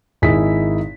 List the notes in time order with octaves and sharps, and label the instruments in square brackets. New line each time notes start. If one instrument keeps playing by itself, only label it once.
[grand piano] G#1 D#4 E4 G#4 B6